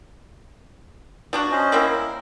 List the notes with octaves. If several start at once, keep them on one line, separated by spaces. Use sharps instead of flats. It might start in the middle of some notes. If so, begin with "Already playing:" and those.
F3 D4 F#4
C#4 C5 D#5
A#3 C4 E4
A#4